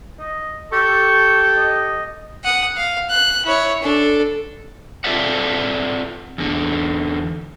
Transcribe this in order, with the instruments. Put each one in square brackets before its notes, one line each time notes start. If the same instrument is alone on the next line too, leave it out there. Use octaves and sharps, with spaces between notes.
[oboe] D#5
[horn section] G4 A4 [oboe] C#6
[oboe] D#5
[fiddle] F#5 D#6
F5
F#6
E4 C#5
D4 A4
[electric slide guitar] C4 F4 A4 D5 E5 F#5
E2 D3